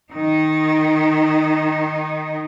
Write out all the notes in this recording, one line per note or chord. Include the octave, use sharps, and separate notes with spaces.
D#3 D#4